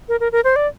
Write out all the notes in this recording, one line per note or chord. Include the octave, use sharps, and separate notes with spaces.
A#4
A#4
A#4
C5
D5